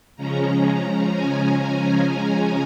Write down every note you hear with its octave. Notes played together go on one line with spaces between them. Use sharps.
C#3 F3 G#3 C#4 A#5
A#5
G#5